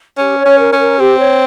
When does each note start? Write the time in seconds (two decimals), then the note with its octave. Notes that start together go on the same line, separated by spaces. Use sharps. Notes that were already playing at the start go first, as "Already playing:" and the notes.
0.18 C#4 G4
0.38 C#5
0.45 C#4
0.59 A#4
0.73 C#4
0.79 A#4
1.00 C4 G4
1.20 C#5